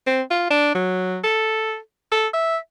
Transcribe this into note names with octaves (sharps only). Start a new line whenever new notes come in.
C4
F4
D4
F#3
A4
A4
E5